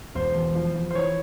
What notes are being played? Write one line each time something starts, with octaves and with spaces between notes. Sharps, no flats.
E1 C5
E2
F3
F3
C5
E3 C#5